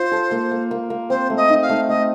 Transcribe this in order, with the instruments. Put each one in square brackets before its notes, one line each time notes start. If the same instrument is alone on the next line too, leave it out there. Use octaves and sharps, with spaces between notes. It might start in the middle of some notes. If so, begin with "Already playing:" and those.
Already playing: [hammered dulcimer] F4 [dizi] C5
[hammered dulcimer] A4
A#3
A#3
A#3
A#3
[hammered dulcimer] C4 [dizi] C5
[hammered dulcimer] A3
[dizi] D#5
[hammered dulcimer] D#4
[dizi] F5
[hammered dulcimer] A3
[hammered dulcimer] A3 [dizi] D#5